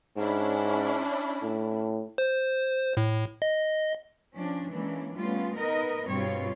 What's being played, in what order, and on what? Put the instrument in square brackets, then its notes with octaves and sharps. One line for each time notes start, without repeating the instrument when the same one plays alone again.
[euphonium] G#2 [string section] C#4 D4 E4
[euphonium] A2
[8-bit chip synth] C5
A2
D#5
[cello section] F3 C#4 D4
E3 G#3 A#3 C#4 D4
G3 A3 B3 C#4 F4
B3 D#4 A#4 B4 D#5
G2 B2 G3 C4 F4 C#5